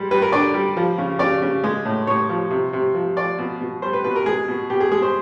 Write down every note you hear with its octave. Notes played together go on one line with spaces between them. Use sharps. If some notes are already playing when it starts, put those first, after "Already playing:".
Already playing: G3 G#3
G3 B4
A#4
D3 D5
G3
F3
C#3
C#3 D5
C#3
G#3
A2
A2 C#5
F3
C3
C3
F3
F3 D5
B2
B2
G3 C5
B4
B2 B4
A#4
G#3 G#4
B2
B2 G4
G#4
G#3 G#4
C5